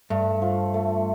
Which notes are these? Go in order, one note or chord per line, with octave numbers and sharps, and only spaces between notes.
G2 A3
F3
A3